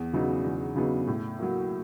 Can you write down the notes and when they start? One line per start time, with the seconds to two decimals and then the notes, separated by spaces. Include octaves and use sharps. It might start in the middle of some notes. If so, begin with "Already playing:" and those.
Already playing: E2
0.13 C#3 F#3 B3 D#4
0.44 E2
0.75 C#3 F#3 B3 D#4
1.07 A2
1.39 F#3 A#3